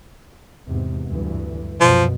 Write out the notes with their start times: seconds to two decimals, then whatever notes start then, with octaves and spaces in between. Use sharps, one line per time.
0.67 E2 G#2 C3
1.06 D2 G2 E3
1.80 C2 F#2 B2 F3